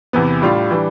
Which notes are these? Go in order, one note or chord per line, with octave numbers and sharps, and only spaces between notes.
E2 C3 E3 B3
A2 G3 D4 F4
E3 G3 D4